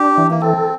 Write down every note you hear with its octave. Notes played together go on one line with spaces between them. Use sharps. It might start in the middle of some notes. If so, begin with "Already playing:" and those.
Already playing: D4 G4
E3
A#3
C4 A4